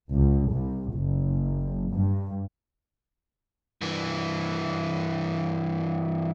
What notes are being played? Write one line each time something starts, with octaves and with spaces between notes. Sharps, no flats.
C#2
C2
F#1
G2
G2 E3